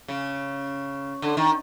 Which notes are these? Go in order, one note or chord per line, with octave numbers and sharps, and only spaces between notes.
C#3
D3
D#3